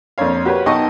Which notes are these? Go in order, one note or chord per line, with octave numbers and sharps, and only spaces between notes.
F2 A#3 D4 C#5 F5
F#4 G4 A#4 B4 C#5
B1 D#4 D#5 G5 A5 C#6